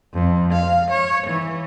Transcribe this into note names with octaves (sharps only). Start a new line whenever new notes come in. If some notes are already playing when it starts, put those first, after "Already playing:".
F2
F5
C#5
E3